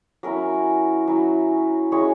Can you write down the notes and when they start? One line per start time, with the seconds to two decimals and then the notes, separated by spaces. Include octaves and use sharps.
0.23 F#3 C#4 E4 A#4
1.07 F#3 C#4 E4
1.92 G#3 C#4 E4 C#5